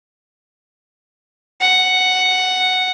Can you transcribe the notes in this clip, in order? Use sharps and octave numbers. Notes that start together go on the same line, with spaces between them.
F#5